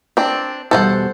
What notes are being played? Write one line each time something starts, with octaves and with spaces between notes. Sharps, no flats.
C4 D4
E2 B2 G3 A4 C5 F#5